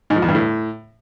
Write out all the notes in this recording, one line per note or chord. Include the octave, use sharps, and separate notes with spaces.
G#2
F3
E2
G2
A2